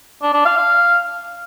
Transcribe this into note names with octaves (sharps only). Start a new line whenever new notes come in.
D4
D4
F5
F5